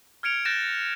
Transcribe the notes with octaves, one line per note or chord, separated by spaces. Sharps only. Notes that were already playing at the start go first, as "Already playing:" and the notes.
F6 G#6 C#7 D7 F7
F#6 G6 A6 A#6 E7